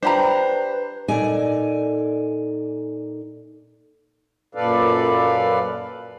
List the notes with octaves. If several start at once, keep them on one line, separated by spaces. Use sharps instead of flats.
D4 G4 B4 C5 A#5 B5
A#2 D#4 A4 D5 G#5
F#2 A#2 A4 B4 D5 F5